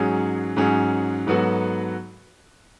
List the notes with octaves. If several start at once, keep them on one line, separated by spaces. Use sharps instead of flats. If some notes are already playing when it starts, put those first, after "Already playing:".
Already playing: G#2 F#3 C#4 G#4
G#2 F#3 C#4 G#4
G#2 F#3 B3 F#4 A4